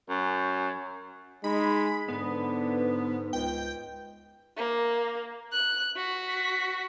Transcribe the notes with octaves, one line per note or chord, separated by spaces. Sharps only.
F#2
G#3 D#4 B5
G#2 D3 B3
C#2 G5
A#3
F#6
F#4 B6